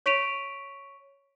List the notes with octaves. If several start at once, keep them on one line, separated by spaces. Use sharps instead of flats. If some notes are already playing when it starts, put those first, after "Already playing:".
C#5 C#6 B6 D7 D#7 F7